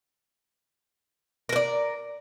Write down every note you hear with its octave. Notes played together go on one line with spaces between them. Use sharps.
A#4 B4 D5